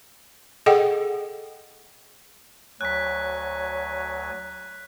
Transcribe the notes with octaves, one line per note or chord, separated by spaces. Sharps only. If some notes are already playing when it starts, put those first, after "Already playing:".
G#4 A4 D#5 F#5 G5
D2 F#3 C#5 G#5 F#6 B6